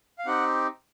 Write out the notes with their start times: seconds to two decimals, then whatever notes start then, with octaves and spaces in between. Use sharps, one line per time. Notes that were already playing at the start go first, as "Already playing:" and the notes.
0.19 F5
0.26 C4 D#4 G4 F#5